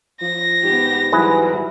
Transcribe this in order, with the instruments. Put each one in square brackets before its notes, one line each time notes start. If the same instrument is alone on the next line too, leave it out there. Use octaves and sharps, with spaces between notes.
[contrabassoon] F3 [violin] A#6
[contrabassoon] G#2 [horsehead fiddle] B3 G4
[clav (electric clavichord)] E3 G#4 B4 [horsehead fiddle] F#3 G3